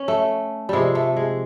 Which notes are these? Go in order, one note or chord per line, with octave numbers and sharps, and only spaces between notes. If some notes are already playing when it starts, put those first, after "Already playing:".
Already playing: C#4
A3
C3 F3 G3 G#3
A3
G#3